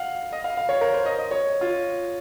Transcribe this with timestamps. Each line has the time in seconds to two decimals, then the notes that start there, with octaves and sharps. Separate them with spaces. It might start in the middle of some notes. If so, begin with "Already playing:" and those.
Already playing: F5 F#5
0.32 D#5
0.44 F5
0.57 F5
0.69 C#5
0.81 A#4
0.94 C5
1.06 D#5
1.19 D#5
1.31 C#5
1.61 F4